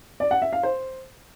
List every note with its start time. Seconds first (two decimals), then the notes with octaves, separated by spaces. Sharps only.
0.20 D5
0.31 F#5
0.42 E5
0.53 F5
0.63 C5